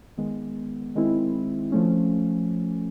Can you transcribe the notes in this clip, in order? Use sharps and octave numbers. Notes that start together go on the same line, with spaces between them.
D#3 G#3 B3
D#3 G#3 C4 E4
F3 A3 C#4